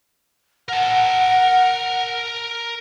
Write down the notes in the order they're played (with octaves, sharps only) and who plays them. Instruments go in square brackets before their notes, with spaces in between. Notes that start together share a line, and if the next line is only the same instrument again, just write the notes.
[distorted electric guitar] A#4 A5 [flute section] F#5